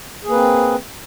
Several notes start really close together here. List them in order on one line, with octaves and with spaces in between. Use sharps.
G#4 A#3 B4 C4